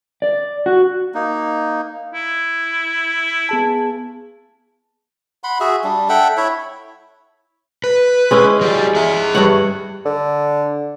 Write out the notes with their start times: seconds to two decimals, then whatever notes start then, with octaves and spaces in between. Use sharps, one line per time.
0.22 D5
0.66 F#4
1.15 A#3 D#4
2.14 E4
3.49 B3 G#4 A5
5.44 F#5 B5 C6
5.60 F#4 G#4 E5
5.84 G3 D4
6.09 A4 E5 F#5 G5
6.37 E4 C#5 E5
7.84 B4
8.31 G#3 C#4 E4
8.61 F#3 G4 D5
8.95 G#4 E5
9.35 G2 C#5 F#5
10.05 D3